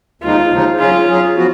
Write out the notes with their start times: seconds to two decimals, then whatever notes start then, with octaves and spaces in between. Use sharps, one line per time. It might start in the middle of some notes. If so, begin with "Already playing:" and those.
0.22 D#2 C#3 F3 G#3 D#4 F4
0.51 D#2 C#3 F3 G#3 D#4
0.79 F#3 C#4 F4 G#4
1.08 F#3 C#4 G#4
1.36 F3 B3 F#4